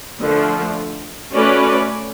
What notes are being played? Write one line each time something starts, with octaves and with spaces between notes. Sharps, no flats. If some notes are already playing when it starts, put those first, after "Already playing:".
D3 F3 A3
A3 C#4 F#4 B4 D5